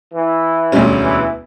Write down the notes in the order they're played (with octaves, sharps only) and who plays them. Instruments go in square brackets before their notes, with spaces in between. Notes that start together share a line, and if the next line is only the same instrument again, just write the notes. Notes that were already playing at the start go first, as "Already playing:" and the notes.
[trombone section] E3
[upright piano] E1 D2 D3 G3 C#4
[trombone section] E3